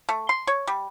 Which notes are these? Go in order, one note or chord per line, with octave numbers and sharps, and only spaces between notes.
A3
C6
C#5
G3